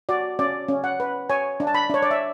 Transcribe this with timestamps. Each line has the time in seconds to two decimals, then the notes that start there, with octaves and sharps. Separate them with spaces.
0.09 F#4 D5
0.39 C#4 D5
0.68 C#4
0.84 F#5
1.00 B4
1.29 C#5 G#5
1.60 D4
1.67 A5
1.75 B5
1.90 D4 C#5
2.03 D5
2.11 E5